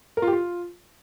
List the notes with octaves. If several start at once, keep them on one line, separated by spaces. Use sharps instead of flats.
A#4
F4
G4
F4